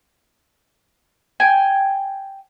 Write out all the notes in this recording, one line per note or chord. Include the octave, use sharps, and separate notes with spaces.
G5 G#5